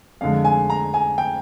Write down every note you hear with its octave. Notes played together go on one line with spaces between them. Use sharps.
F2 D3 G#3 F5
G#5
A#5
G#5
G5